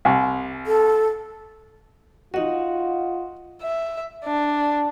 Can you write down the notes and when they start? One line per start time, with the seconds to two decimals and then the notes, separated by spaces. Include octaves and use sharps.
0.05 C2
0.67 A4
2.34 D#4 F4 F#4 D#5 F#5
3.62 E5
4.25 D4